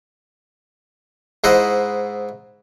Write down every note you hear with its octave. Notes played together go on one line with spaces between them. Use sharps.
G#2 E4 C5 D#5 F#5